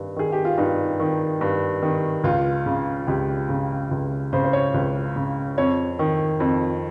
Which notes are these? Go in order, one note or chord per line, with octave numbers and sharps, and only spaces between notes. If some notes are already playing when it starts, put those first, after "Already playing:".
Already playing: G2 D#3
D#3 G#4
G4
F4
G2 D#4
D#3
G2
D#3
C#2 F4
C#3
C#2 G4
C#3
C#2
C#3 C5
C5
C#5
C#2
C#3
F2 C#5
D#3
F2